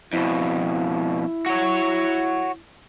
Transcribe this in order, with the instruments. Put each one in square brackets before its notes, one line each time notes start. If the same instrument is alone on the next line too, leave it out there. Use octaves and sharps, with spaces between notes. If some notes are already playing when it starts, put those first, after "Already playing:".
[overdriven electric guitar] F2 B2 [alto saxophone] E4
[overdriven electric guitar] F#4 C#5